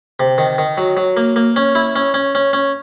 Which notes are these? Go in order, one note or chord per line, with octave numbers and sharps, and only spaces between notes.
C3
D#3
D#3
F#3
F#3
A#3
A#3
C#4
E4
C#4
C#4
C#4
C#4